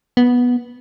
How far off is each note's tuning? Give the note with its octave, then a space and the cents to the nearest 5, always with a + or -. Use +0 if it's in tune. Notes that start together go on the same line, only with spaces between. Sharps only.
B3 -10